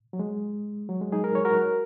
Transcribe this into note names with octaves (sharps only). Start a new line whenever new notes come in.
F#3
G#3
F#3
G#3
D#4 G#4
A#4
C#5
F#4 A#4